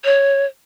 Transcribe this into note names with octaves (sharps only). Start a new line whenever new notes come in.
C#5